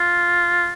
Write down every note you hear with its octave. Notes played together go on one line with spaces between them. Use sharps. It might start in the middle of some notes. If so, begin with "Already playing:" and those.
Already playing: F4